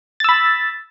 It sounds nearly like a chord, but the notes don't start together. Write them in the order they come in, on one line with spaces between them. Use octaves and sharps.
A6 E6 B5